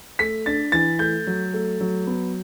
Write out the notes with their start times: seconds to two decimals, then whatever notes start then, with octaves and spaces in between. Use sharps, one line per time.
0.19 A3 B6
0.46 D4 A6
0.72 E3 A6
0.99 A3 G6
1.27 F#3
1.54 A3
1.80 F#3
2.07 B3